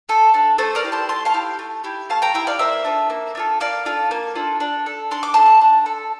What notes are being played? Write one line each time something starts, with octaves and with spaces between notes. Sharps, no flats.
A3 A4
D4 A4
A3 A4 C5
A#4 D5
E4 G4
A5 C6
A3 A5 C6
F5 A5
E4 G4
A3
E4 G4
A3 F5 A5
G5 A#5
E4 G4 E5 G5
D5 F5
A#3 C5 E5
D4 F4 A4
A#3
D4 F4 A4
A#3 D5 F5
D4 F4 A4
A#3
D4 F4 A4
D4
A4
D4 C6
D6
A4 A5 C6
D4
A4